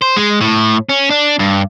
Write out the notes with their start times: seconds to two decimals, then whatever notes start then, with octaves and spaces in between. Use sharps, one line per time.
0.02 C5
0.17 G#3
0.41 A2
0.89 C#4
1.10 D4
1.39 G2